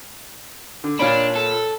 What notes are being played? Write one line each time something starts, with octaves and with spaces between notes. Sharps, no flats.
D3
A#2 D4 C#5 B5
A4